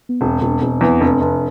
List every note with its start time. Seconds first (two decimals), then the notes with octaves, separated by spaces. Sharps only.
0.09 B3
0.21 E1 C4
0.41 E1 D4
0.61 E1 C4
0.81 E2 C4
1.01 F1 D4
1.21 F1